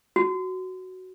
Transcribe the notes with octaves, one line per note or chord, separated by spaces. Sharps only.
F#4